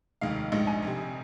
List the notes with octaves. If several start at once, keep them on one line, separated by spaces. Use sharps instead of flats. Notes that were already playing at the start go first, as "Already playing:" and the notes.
F1 D#2 D#3 G#3 F5
A#1 G#2 G#3 D#5
G#5
F1 F2 C3